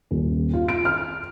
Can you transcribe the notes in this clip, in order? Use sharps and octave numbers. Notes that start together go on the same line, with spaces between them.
D#1
F4
D7
F6